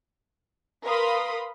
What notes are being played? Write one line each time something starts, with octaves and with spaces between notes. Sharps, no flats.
A#4 B4 F5 B5 C6 D#6